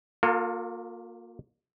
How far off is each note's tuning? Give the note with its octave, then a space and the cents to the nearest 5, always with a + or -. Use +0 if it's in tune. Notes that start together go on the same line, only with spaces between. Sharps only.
A#3 +0 F4 +35 A4 +40